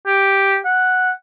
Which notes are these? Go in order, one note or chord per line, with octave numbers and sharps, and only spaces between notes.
G4
F#5